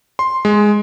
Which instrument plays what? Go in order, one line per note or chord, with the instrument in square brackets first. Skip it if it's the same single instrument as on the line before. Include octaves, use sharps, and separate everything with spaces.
[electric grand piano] C6
G#3